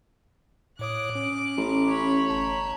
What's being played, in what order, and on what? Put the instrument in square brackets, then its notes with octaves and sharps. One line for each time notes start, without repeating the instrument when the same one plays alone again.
[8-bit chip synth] A2 C#5 D#6 [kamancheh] D6 F#6
[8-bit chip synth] C#4
[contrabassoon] A1
[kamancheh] C#5 B5
[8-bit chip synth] G1 A5 A#5